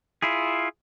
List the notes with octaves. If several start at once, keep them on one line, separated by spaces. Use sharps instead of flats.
E4 F4 G#4